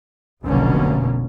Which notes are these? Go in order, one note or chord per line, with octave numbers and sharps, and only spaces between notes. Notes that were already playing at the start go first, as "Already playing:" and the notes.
F1 B1 B2 D3 A#3 C#4